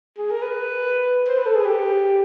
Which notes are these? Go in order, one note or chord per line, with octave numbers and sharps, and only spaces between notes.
G#4
A#4
B4
C5
B4
A4
G#4
G4